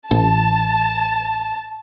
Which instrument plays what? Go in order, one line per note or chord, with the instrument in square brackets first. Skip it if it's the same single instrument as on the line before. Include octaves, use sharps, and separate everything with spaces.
[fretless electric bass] A1 [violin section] A5